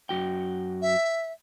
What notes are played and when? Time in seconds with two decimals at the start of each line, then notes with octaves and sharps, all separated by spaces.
0.09 F#2 F#4 G5
0.82 E5